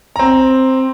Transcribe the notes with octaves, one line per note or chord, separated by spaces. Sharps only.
C4 A#5